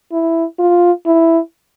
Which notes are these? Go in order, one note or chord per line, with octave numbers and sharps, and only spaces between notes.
E4
F4
E4